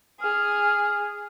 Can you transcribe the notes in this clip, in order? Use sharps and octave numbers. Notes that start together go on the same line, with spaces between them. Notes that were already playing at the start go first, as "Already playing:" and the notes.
G#4 F6